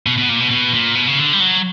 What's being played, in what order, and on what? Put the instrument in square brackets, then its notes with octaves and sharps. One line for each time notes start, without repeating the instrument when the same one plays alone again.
[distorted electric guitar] B2
B2
A#2
B2
B2
A#2
B2
C#3
D3
G3
F#3